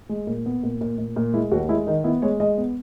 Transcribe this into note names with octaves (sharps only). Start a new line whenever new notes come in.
G#3
A#2
B3
A#2
A#2
A#2
A#2
G#3 E4
D#2 F#4
G#3 E4
D#3 D#4
B3 E4
G#3 C#5
G#3 D#5
B3